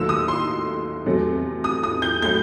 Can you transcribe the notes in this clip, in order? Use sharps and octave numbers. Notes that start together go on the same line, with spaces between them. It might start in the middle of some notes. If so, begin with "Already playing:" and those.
Already playing: D#2 D#3 F#3 A3 E6
D#6
C6
E2 C3 F#3 A3
D#6
D#6
G6
A2 F#3 A3 G6